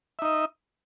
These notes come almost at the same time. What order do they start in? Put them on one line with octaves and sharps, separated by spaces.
E5 D#4 D#5